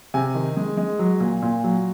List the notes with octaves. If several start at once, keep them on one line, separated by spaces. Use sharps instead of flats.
C3 G#5
D#3
G#3
G#3
F#3
A#2
A#2
F#3